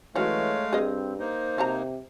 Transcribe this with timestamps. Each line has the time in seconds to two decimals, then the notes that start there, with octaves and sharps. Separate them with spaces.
0.16 E3 F#3 G#3 A3 C#4 C#5 F5
0.73 G2 C4 G#4 D#5
1.19 A#3 D#4 C5
1.58 C3 F5 A5 A#5